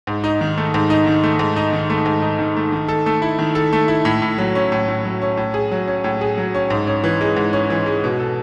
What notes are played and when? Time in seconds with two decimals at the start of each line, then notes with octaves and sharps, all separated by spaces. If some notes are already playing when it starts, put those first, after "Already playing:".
0.07 G#2
0.24 D#4
0.41 D#3
0.58 A3
0.74 G#2
0.90 D#4
1.07 D#3
1.23 A3
1.39 G#2
1.56 D#4
1.73 D#3
1.90 A3
2.06 G#2
2.22 D#4
2.39 D#3
2.57 A3
2.72 D#3
2.88 A4
3.06 A3
3.22 E4
3.39 D#3
3.55 A4
3.73 A3
3.88 E4
4.05 A2
4.22 A2
4.38 F#3
4.55 C#4
4.72 A2
4.88 A2
5.05 F#3
5.22 C#4
5.37 A2
5.54 G#4
5.71 F#3
5.88 C#4
6.04 A2
6.21 G#4
6.38 F#3
6.55 C#4
6.70 G#2
6.87 C#4
7.04 E3
7.21 G#3
7.36 G#2
7.53 C#4
7.70 E3
7.86 G#3
8.04 B2
8.20 A4